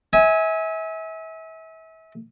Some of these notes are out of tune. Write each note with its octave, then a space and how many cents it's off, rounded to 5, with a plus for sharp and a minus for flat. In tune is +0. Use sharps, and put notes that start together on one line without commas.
E5 -35 G#5 +0